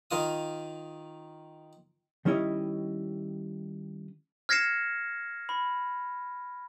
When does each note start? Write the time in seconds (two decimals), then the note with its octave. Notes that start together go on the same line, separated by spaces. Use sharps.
0.11 D#3 F4 D#6
2.25 D#3 G3 C#4 E4 D#5
4.49 F6 G#6 A#6 C7 C#7 E7
5.49 B5